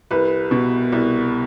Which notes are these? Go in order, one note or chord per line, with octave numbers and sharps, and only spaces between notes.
C2 B4
B2
C2